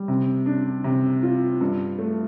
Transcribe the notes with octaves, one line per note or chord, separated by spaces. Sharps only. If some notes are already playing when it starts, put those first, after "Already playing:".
Already playing: G3
C3
D4
C3
F4
G2
A3